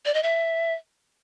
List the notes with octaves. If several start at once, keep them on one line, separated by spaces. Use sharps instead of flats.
D5
D#5
E5